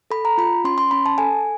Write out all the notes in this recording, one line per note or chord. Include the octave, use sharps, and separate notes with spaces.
A4 B5
A#5
F4 B5
C#4 C6
C6
C#4 B5
A5
A4 G#5